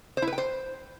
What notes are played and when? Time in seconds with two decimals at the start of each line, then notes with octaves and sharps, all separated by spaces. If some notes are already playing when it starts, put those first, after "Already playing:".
0.17 C5
0.22 E4
0.27 B4
0.33 G5
0.38 C5